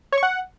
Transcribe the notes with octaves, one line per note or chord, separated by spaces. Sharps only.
C#5
C#6
F#5